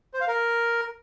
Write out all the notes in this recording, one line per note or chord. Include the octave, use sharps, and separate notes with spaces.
C5
F5
A#4